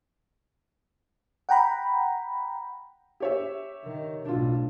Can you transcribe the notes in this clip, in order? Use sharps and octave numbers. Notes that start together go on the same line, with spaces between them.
F#5 G5 A#5 B5
G4 C#5 E5
D#3
B1 A2 D4 F4